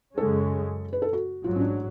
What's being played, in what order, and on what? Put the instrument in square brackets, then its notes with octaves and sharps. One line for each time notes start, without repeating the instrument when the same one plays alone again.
[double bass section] F#2 C#3 G#3 C#4 [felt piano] A4
[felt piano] B4
A4
F#4
[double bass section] A1 G#2 F#3 [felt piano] F4
[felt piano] C#4
D4